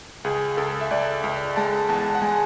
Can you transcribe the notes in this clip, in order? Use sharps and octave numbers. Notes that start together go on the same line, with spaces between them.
C#2 G#4
C#2 A4
E5
C#2 D5
C#2
G#3 A5
E2 A5
F#5
G#3 G#5